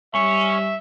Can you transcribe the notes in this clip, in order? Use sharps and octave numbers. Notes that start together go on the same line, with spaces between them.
G3 C#4 E5 C#6